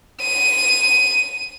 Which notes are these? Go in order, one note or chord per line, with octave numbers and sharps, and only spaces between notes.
D#7